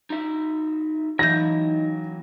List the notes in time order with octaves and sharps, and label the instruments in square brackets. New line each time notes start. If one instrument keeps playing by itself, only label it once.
[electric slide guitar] D#4 F#4 E5
[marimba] E3 G6 [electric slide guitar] F#3 A#3 E4 [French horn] D#4 [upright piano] A#6